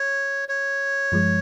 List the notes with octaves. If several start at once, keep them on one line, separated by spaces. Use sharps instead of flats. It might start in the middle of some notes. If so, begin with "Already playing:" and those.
Already playing: C#5
C#5
G2 F3 G#3